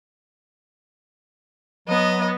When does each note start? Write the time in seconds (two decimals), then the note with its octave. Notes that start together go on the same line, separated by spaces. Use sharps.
1.88 F#3 B3 D#5